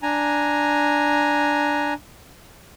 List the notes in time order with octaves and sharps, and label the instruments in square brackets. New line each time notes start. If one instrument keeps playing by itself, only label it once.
[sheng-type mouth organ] D4 G#5 A#5